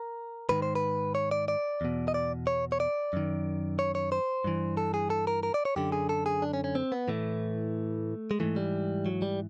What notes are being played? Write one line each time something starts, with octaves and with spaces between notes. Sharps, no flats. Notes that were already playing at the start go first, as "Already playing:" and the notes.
Already playing: A#4
G#2 D#3 B4
C5
B4
C#5
D5
D5
E2 B2
D#5
D5
C#5
C#5
D5
F#2 D#3
C#5
C#5
C5
G2 E3
A4
G#4
A4
A#4
A#4
D5
C#5
F#2 D3 G4
G#4
A4
G#4
D4
C#4
C#4
C4
B3
A2 E3 A3
G#3
G#2 E3 A3
G3
F#3
G3